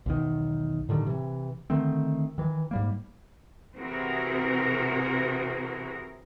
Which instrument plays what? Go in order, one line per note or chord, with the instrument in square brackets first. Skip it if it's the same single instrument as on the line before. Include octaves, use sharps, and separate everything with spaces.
[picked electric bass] B1 E2 D#3
A2 D3 D#3 G3
C3 E3
D3 D#3 A3 C4
D#3 E3
G#2 G3 A#3
[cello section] C3 E3 C4 F#4 G#4 A#4